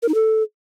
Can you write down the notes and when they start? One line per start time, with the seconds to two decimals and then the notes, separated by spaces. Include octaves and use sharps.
0.03 A#4
0.09 D#4
0.15 A4